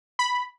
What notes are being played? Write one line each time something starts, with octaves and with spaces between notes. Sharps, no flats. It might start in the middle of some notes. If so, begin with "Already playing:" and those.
B5